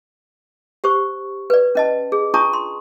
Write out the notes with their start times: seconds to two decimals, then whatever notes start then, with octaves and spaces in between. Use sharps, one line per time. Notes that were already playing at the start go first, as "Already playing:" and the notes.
0.84 G4 C5 C#6
1.50 B4 D5
1.75 C#4 D#5 A5
2.12 G#4
2.34 D4 F4 A5 A#5 C#6 D#6
2.53 C6